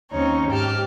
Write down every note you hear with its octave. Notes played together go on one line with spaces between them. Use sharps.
D#2 C4 C#4 D#4 C#5
G#2 G4 G5 A5 F6